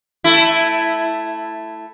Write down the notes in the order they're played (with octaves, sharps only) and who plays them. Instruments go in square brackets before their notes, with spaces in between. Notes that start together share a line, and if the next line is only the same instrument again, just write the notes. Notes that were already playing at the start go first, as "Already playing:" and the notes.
[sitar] A3 E4